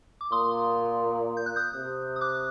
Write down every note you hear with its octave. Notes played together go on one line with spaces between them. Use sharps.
D6
A#2 C6 D#6
G6
F#6
D#6 G6
C3
D#6
D6 F#6